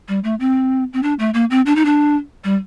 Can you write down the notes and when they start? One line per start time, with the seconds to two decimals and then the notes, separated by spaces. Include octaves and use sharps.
0.08 G3
0.24 A3
0.40 C4
0.93 C4
1.03 D4
1.19 A3
1.34 A#3
1.50 C4
1.66 D4
1.76 D#4
1.85 D4
2.44 G3